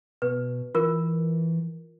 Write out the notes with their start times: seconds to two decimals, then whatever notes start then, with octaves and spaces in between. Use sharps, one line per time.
0.22 B2 B4
0.75 E3 F4 A#4